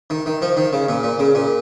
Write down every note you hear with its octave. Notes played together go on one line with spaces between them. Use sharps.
D#3
D#3
F3
D#3
C#3
A#2
A#2
C#3
A#2